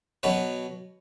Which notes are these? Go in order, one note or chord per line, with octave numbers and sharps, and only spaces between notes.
B2 F#3 B4